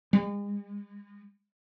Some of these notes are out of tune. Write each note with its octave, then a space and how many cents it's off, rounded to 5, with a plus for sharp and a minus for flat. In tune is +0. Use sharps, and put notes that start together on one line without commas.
G#3 -40